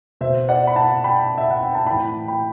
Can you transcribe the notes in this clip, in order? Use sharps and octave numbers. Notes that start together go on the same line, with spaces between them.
B2 C5 E5
D5 F#5
B5
F#5 A5
G5 B5
E5
F#5
G5
A5
A2 E3 G5 B5
G5 B5